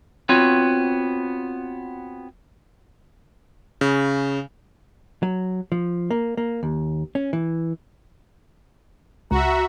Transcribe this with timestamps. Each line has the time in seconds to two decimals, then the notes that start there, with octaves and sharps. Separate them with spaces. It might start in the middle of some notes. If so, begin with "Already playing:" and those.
0.29 B3 C4 F4 F#4 C#5
3.81 C#3
5.23 F#3
5.72 F3
6.11 A#3
6.37 A#3
6.63 D#2
7.15 C#4
7.33 E3
9.31 C#2 F#4 E5 A#5